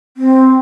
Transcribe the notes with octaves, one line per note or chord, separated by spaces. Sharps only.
C4